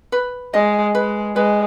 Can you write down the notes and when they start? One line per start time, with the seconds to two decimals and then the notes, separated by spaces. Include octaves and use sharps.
0.12 B4
0.54 G#3 D#5
0.95 G#3 B4
1.36 G#3 B4